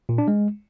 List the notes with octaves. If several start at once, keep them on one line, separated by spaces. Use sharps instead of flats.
A#2
D4
G#3